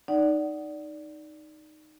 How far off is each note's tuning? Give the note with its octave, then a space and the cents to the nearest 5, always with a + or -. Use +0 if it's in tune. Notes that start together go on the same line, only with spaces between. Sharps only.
D#4 -10 D5 -10 F#5 +25